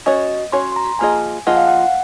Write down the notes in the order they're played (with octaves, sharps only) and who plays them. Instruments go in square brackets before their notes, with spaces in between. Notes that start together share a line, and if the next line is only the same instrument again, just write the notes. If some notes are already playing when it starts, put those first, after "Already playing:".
[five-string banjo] C#4 F#4 C#5 [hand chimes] D#5
[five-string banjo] C#4 F#4 C#5 [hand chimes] C6
[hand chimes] C6
A#5
[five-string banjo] F3 A#3 F4 G#4 D#5 [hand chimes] G#5
[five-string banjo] F3 A#3 F4 G#4 D#5 [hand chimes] F#5
[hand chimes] F5
F#5